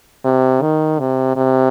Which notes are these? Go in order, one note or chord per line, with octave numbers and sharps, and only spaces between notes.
C3
D#3
C3
C3